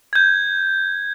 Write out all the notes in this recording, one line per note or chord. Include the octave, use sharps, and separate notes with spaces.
G6 G#6